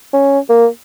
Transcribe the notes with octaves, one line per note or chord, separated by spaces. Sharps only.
C#4
A#3